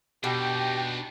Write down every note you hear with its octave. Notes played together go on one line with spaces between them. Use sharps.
B2 D4 D#4 G4 G5